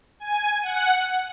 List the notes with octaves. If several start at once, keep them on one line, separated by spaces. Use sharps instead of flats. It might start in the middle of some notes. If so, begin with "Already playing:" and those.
G#5
F#5